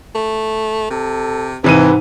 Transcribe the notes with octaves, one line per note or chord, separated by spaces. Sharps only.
A3
C3 A4
D#2 G#2 C3 E3 B4 D#7